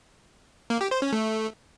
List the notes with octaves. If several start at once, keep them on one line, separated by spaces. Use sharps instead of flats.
A#3
G4
C5
C#4
A3